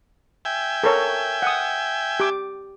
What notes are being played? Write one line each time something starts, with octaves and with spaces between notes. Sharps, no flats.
E5 G5 G#5
A4 A#4 C#5
F#5 D#6
G4 D6